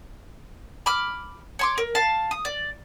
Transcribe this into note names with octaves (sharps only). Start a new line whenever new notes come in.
B5 D6 F6
C#5 C6 D6
A#4
F5 A5
D#6
D5